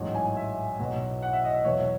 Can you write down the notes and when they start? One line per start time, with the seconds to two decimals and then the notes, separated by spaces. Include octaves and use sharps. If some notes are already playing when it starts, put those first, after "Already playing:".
Already playing: A1 G#2 F#3
0.15 G#5
0.36 E5
0.79 B1 B2 F#3
1.23 F#5
1.33 E5
1.44 D#5
1.54 E5
1.65 E2 B2 F#3 C#5